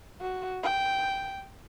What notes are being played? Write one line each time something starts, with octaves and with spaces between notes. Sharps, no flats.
F#4
G5